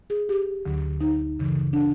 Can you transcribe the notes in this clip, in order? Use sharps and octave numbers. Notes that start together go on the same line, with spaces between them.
G#4
G4
D2 D3 F#3
D#4
F#2 C#3 E3
D4